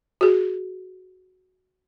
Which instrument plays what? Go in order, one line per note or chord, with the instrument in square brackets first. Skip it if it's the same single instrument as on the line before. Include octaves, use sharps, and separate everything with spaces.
[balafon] F#4 G#4